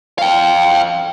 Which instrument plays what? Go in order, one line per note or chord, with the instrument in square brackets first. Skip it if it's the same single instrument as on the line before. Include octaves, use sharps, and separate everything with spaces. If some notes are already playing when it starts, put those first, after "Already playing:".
[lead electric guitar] F5 G5